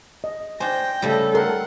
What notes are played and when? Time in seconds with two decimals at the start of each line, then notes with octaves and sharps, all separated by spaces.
0.24 D#5
0.60 D4 C5 G5 G#5 A#6
1.02 C#3 G3 A3 A4
1.35 A#4 F#5 G5 C6